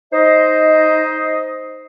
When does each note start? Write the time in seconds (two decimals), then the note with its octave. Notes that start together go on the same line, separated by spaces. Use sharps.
0.13 D#4 C5 D#5